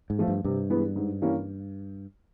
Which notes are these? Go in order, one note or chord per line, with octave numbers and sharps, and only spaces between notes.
G#2
F3 A3
G2
G2 C3
E3 G#3 B3
G#2
E3 G3 A#3 C#4